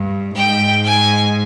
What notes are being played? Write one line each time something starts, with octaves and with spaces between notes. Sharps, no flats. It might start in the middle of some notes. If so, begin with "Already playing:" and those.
Already playing: G2
G#2 G5
G#5